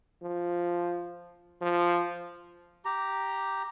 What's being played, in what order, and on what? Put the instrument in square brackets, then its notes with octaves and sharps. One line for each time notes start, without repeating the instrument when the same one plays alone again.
[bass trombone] F3
F3
[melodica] G4 A#5